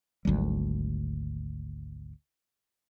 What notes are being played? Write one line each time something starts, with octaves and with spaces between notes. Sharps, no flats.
G#1 D2 F#3 G3